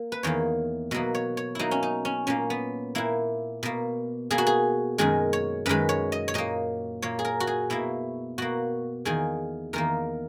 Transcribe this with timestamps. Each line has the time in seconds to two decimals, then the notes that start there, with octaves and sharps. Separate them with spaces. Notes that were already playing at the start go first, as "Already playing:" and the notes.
Already playing: A#3
0.12 B4
0.23 E2 D#3 A#3 C#5
0.91 B2 F#3 A#3 D#5
1.15 C#5
1.37 C#5
1.55 B2 F#3 A#3 D#4 E4
1.71 C#4
1.83 D#4
2.05 C#4
2.27 A#2 A#3 C#4
2.50 B3
2.95 A#2 A#3 E4
3.63 B2 A#3
4.30 B2 A#3 G#4
4.38 F#4
4.47 G#4
4.98 F#2 D#3 G#3 G#4
5.33 C#5
5.66 F#2 D#3 G#3 B4
5.89 C#5
6.12 D#5
6.28 C#5
6.34 A#2 A#3 D#5
7.02 A#2 A#3 C#5
7.19 G#4
7.25 A#4
7.40 F#4
7.47 G#4
7.70 B2 A#3 E4
8.38 B2 A#3 F#4
9.05 E2 D#3 A#3 G#4
9.73 E2 D#3 A#3 A#4